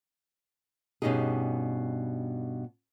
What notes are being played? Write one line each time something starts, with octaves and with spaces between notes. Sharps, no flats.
G2 B2 C#4 D#4 G4 G#4